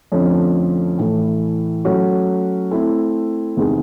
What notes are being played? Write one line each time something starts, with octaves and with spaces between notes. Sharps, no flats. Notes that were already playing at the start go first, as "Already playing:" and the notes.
F2 D3 F3 A3 C#4
A2 E3 A3
F#3 A3 C#4 F#4 A4
A3 C4 E4
E2 C3 D#3 G#3